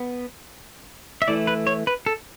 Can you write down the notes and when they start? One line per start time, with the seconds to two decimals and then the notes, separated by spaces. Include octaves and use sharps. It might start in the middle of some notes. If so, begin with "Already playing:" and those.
Already playing: B3
1.22 E5
1.28 E3 A3 E4 D5
1.47 B4
1.67 C#5
1.87 B4
2.06 A4